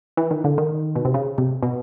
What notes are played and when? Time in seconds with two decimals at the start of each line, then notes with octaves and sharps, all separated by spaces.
0.17 E3
0.31 D#3
0.44 D3
0.58 D#3
0.95 B2
1.05 C3
1.14 C#3
1.38 C3
1.63 B2